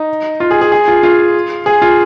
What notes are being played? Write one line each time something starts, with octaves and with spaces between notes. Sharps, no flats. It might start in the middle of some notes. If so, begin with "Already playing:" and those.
Already playing: D#4
F4
G#4
G#4
G#4
F4
F4
G#4
F4